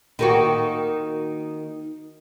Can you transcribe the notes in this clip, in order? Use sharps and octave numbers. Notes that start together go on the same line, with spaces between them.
D#3 A#3 F#4